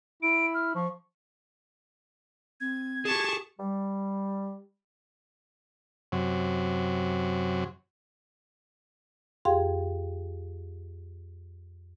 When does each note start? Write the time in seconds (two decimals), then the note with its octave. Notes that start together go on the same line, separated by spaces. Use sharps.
0.23 E4 D7
0.54 F6
0.75 F3 C#6
2.61 C4 G#6
3.05 G4 G#4 A5 C#6
3.60 G3
6.12 F#2 C3 F#3
9.45 F2 G4 G#4 F5 G5 C6